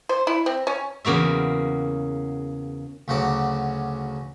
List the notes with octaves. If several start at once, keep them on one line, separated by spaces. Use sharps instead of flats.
C5
E4
C4
C#4
E2 C#3 A#3 F#4 E5
D2 C#3 F#3 C#5 D6